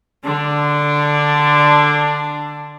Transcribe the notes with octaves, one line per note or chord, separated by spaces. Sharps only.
D3 D4